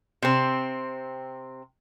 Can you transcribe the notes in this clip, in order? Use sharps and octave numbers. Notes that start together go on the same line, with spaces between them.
C3 C4